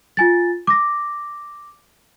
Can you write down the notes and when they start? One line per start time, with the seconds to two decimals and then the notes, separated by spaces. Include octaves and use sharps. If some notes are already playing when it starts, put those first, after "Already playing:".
0.17 F4 G#5 A6
0.67 D6 A#6